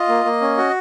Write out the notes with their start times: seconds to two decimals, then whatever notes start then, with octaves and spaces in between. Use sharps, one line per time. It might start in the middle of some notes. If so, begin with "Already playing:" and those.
Already playing: F4 D#5
0.09 A#3
0.25 A#3
0.41 C#4
0.57 F#4